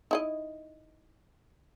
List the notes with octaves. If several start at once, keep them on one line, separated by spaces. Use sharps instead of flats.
D#4 E4 D#5